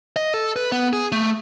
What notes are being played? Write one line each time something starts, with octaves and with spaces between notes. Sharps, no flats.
D#5
A4
B4
B3
G#4
A3